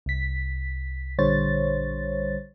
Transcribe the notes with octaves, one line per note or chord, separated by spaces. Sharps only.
C2 B6
A#1 D3 G3 C5 C#5 A6